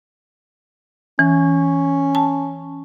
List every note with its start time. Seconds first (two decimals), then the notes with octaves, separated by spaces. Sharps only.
1.19 E3 C#4
2.15 A5